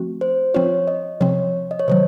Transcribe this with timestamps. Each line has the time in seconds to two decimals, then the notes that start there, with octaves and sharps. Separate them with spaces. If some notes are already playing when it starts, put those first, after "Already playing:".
Already playing: F3 A3 C4 F#4
0.21 C5
0.54 F3 C4 F4 C#5
0.88 D#5
1.21 C3 F3 C4 C#5
1.71 D#5
1.79 C#5
1.88 C3 D#3 F#3 C5